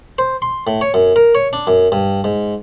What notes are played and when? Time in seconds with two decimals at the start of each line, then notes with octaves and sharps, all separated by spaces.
0.18 C5
0.42 C6
0.67 A2
0.81 C#5
0.94 F#2
1.16 A#4
1.35 C#5
1.53 D4
1.67 F#2
1.92 G2
2.24 G#2